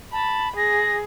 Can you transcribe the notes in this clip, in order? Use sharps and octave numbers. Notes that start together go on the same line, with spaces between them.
A5 B5
G#4 A#6